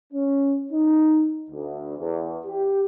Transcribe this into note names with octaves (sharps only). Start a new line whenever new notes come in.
C#4
D#4
D2
E2
G4